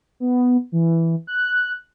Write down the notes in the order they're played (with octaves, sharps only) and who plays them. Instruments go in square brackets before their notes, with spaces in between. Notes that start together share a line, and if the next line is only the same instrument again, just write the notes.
[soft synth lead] B3
E3
F#6